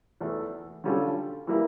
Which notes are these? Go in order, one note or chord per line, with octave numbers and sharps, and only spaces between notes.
E2 E3 A3
D3 G3 C#4 F4 A4
E3 G3 A#3 E4